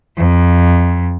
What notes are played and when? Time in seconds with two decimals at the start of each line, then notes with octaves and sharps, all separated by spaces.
0.17 F2